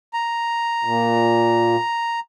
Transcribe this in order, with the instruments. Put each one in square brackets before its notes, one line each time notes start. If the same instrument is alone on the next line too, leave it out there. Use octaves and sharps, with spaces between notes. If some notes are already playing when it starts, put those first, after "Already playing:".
[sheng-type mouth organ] A#5
[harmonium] A#2